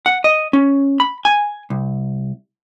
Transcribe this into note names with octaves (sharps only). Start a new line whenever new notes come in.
F#5
D#5
C#4
B5
G#5
C2